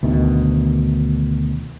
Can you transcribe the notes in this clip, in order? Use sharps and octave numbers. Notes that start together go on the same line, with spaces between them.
D2 B2 D#3